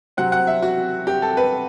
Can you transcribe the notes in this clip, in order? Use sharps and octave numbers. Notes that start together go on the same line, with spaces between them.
C3 F#3 C4 F#5
F#5
E5
F#4
G4
A4
B4